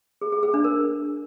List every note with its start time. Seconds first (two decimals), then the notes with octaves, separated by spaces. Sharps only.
0.21 G#4
0.32 G#4
0.43 G#4
0.54 D4
0.64 A#4